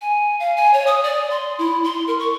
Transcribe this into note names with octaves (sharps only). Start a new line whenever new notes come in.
G#5
F5
G#5
C#5
D#6
D5
C6
E4
C6
A#4
C#6